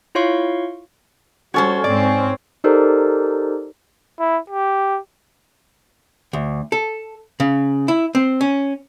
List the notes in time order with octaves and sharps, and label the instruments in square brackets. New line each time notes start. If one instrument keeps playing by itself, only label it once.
[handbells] E4 F4 C#5 F5 C6 C#6
[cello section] G3 [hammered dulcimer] C#4 C#5 [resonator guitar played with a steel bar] F#4 A4 C5
[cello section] G#2 C4 [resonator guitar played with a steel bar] D5
[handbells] D#4 G4 A4 A#4 C5 D5
[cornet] E4
G4
[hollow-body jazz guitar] D2
A4
C#3
E4
C4
C#4